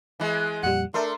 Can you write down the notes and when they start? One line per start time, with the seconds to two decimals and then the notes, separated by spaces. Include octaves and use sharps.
0.20 E3 G#3
0.63 F2 A#2 G3 F#5
0.94 A3 D4 A#4 E5 C6